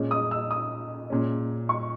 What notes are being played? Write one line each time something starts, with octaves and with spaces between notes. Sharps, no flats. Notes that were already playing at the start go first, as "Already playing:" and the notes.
Already playing: A#2 G#3 C#4
D#6
E6
D#6
A#2 G#3 C#4
C#6